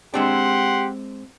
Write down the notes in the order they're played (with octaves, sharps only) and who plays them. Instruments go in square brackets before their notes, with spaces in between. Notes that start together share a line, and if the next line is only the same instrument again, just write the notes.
[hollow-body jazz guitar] G#3 C4 D4 [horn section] G4 F#5 C6